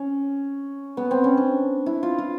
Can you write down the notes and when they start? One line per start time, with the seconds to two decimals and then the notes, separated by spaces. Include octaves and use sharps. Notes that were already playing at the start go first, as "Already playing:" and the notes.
Already playing: C#4
0.97 B3
1.11 C4
1.24 C#4
1.37 D4
1.86 E4
2.03 F4
2.18 F4